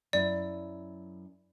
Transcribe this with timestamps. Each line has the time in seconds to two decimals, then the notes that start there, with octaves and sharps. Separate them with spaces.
0.13 F#2 E4 D5